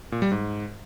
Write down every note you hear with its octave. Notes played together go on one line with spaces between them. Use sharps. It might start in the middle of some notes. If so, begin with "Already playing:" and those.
A#2
G3
G#2